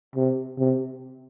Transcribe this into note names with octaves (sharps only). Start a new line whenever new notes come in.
C3
C3